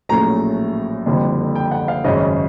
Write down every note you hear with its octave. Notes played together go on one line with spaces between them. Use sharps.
A#1 A2 F#3 A3 C#4 A#5
F#1 F2 D3 G3
G5
F#5
F5
G#1 F#2 C#3 D#5